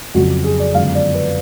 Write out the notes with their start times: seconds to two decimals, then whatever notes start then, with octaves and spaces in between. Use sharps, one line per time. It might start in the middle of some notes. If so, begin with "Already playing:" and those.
0.14 F2 C#3 F#3 F#4
0.44 G#4
0.59 D5
0.75 F#2 D3 F3 G#3 B3 F5
0.95 D5
1.15 B4